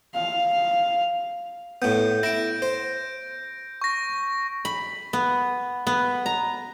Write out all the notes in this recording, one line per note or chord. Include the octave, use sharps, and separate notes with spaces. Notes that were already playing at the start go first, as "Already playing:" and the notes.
F5
A2 B3 G6
E4 A#6 D7
C5
C#6 A#6
B5
B3
B3
A#5